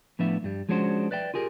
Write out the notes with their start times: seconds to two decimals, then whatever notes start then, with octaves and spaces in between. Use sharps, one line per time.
0.19 A2 F3 B3 D4 E5
0.44 G2 G3
0.69 F3 G#3 C#4 D4 F#4 C5
1.11 B4 D5 E5 G5
1.34 F4 G4 G#4 A#4